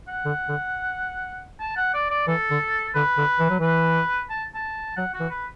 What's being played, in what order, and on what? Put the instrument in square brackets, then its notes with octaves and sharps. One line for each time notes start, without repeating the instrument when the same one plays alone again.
[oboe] F#5
[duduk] D3
D3
[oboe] A5
F#5
D5
D5
[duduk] E3 [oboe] A4
[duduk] D3
[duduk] D3 [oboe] B4
[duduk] D3
E3
F#3
[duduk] E3 [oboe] B4
[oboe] A5
A5
[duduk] F#3 [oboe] F#5
[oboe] F#4
[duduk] E3
[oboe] B4